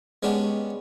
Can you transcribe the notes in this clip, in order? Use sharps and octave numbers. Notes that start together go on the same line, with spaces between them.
G#3 B3 C#4 D4 G4